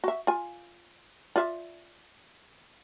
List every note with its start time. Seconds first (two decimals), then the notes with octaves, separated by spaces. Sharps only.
0.04 F#4 E5
0.27 F4 G#5
1.36 F4 D5 E5